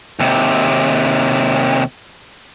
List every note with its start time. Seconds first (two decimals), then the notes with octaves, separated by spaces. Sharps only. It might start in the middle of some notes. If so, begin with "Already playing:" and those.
0.19 D#2 C3